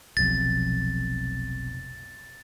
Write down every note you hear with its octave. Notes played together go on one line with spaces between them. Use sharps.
F1 B1 F2 A6